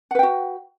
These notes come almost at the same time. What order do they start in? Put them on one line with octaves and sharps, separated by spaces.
F#5 B4 G5 F#4